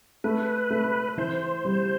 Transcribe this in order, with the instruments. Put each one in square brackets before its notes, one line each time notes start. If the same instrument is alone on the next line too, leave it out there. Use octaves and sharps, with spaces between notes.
[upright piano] A3 [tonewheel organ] B4
[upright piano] A3
[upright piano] E3 [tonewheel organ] C5
[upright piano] G3